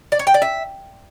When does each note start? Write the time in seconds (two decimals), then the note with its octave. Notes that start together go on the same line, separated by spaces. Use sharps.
0.12 D5
0.19 C#5
0.27 G5
0.34 D5
0.42 E5